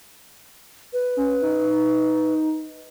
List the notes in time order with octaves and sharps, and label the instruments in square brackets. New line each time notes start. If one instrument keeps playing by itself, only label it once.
[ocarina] B4
[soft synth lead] C#4
D#4